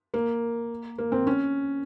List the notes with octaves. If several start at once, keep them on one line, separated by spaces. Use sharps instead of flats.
A#3
A#3
C4
C#4